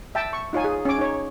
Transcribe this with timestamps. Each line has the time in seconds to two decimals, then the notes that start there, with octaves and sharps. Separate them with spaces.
0.15 E5 G5 A5
0.33 C#6
0.53 D#4 F4 C#5 G#5
0.64 G#4
0.85 C#4 D6
0.98 D#4 C#5